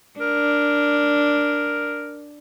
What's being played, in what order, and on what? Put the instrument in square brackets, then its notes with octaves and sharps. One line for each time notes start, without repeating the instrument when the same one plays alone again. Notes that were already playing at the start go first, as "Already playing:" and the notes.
[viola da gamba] D4 [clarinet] A#4